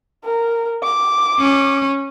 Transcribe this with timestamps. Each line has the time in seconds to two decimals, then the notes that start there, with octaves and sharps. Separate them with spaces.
0.25 A#4
0.83 D6
1.38 C#4